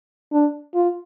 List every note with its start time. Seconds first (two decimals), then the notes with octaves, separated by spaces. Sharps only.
0.32 D4
0.75 F4